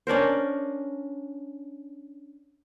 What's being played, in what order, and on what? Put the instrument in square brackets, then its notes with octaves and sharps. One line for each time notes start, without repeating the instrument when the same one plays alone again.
[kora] C#4 D4 A#4 C5